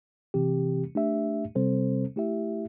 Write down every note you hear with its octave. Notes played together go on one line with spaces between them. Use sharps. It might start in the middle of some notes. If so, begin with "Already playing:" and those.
C3 E3 C4 G4
A3 D4 G4 E5
C3 G3 C4 A4 C5
A3 E4 G4 E5